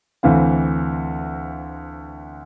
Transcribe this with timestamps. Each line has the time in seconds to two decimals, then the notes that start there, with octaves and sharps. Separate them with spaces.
0.23 D2 E3 C4 F5